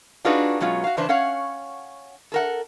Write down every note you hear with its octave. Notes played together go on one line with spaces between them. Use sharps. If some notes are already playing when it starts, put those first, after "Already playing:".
D4 D#4 F4 F#4 G#4 B4
B2 F#3 G#3 C#4 F4
F#4 F5
C#3 E3 D4 B4 C5
C#4 C#5 F5 F#5
A4 A#4 F#5